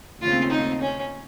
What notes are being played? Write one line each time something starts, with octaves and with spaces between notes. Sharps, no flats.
D#2 C#3 A3 C4 F4
D#4
C#4